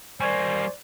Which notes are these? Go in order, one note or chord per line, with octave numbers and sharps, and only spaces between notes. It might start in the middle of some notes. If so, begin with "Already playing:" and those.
G3 A#3 C5 D5 G#5 C#6 G#6